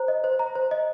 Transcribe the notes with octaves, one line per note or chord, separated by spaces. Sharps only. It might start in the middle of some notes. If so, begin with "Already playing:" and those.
Already playing: C5 A#5
D#5
C5
A#5
C5
D#5